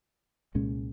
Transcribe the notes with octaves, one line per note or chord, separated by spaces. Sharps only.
C2 A#2 G#3 C#4